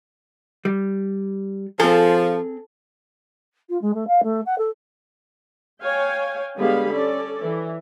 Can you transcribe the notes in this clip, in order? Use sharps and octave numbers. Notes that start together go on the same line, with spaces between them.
G3
F3 C4 G#4 A4
F4
G#3
A3
F5
A3
F#5
A4
C#5 F5 G5 G#5
D3 G3 G#3 B3 F5 B5
C#4 A4 D5
E3